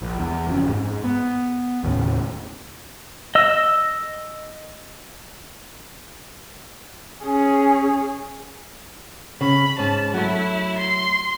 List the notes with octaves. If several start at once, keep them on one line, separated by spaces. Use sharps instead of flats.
A#1
E2
F#1 F2 C#4
G#2
B3
D#2 A2 C#3
D#5 E6
C#4 G#4
C#3 B5
G#2 C#4 A5
F#3 A3 E4
C6